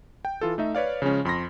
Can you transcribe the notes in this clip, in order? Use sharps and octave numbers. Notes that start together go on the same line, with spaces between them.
G5
E3 F4 A4
A3 D#4 E5
B4 C#5 D5 F5
C#3 F3 G#3 C#4
F2 B5 C6 A#6